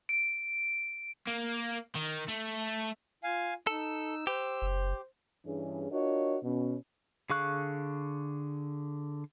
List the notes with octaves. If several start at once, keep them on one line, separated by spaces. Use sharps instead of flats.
D7
A#3
D#3
A3
F4 F5 G#5
D#4 A4 E6
G4 C5
F#1
G2 E3 C#4 D4 G#4
D4 F4 F#4 A#4 C#5 D#5
B2 C#4
D3 G#4 F5 C#6 F#6